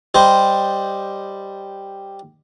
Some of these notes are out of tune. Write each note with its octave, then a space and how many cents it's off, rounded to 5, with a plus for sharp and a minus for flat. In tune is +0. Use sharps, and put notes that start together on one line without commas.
G3 +0 C5 -5 D#5 +0